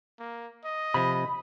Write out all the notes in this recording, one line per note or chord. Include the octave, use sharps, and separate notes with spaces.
A#3
D#5
C3 F3 B5